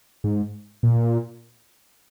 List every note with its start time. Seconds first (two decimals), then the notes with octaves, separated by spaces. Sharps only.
0.24 G#2
0.83 A#2